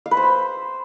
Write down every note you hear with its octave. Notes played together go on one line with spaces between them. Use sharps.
F5
B4
C5
E6